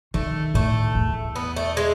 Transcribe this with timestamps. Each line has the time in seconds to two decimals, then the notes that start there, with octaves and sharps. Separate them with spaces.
0.14 D#3 A3
0.54 A2 A3
0.95 E2
1.36 B3
1.56 A3
1.77 G#3